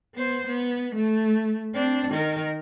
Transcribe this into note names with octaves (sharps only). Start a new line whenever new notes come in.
B3 C5
B3
A3
C4 D4
D#3 A#4